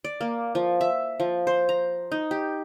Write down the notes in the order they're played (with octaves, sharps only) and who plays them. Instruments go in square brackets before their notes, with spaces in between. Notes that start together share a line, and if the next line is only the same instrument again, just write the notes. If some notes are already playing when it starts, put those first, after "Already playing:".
[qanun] D5
A#3
F3
E5
F3
C5
A#5
D#4
G4